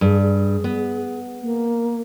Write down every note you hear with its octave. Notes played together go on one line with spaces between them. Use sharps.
G2 G#4
G#4
B3
A#3